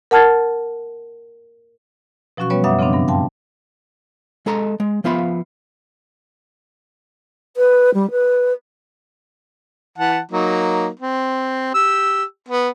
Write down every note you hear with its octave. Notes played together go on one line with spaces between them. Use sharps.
A#4 F#5 A5 F6 G#6 A6
B2 F3 F#3 C#4 F#4 C#6
G3 B3 C#4 B4 C#5
F#2 E5 F#5 D6 D#6
C#3 F3 B3 C4 D4
G2 C#3 B3
F5 G5 A5 C6
G#3 A4 D#5 A#5
G#3
F3 B3 F4 E5 A#5 B5
B4
G3
B4
E3 F#5 A5
F#3 A#3 D#4
C4
G4 E6
B3